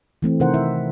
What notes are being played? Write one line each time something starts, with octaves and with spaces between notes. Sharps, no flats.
E3 A3 C4
C3 D#3 D#4 A#4 C5 F#5
E4 E5